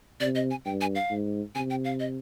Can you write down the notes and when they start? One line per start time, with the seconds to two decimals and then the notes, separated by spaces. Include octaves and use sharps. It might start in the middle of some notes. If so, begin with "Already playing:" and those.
0.21 C3 D5
0.35 D#5
0.51 G#5
0.65 G2 G5
0.81 G#5
0.95 F5
1.11 G#2
1.55 C3 G#5
1.70 G5
1.85 F5
2.00 D#5